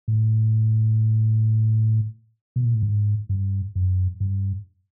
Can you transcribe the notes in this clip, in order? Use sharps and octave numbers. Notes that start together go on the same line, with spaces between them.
A2
B2
A#2
A2
G#2
G2
F#2
G2